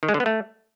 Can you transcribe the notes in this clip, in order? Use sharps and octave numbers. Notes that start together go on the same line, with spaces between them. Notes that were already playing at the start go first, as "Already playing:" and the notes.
D#3
G#3
D3
B3
A3